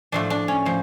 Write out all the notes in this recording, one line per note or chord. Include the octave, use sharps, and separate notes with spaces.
A2 F3 A3 D4
D4
C#4
A2 F3